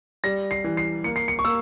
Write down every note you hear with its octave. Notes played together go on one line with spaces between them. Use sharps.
G3 A#6
C7
E3
C7
A#3 C#7
C7
C#7
C#6
A#3 E6